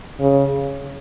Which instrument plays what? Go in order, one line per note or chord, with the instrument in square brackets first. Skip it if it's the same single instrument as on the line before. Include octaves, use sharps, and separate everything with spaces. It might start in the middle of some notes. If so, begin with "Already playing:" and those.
[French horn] C#3